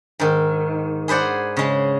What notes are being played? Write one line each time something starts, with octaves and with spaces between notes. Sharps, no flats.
G#2 D#3
G#4 B4 C5 D5 F#5
C#3 G#3